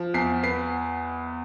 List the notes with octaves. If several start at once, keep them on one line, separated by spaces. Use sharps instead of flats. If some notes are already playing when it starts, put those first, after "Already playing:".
Already playing: F3
E2 C7
B3 C7